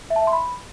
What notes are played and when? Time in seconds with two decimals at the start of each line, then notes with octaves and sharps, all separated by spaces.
0.10 E5
0.16 A5
0.22 E5
0.27 C6
0.33 B5